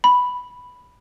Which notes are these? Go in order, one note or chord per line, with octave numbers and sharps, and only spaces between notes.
B5